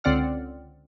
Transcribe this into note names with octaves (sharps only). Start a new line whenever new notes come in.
C#2 D3 C4 D5 F#5 F6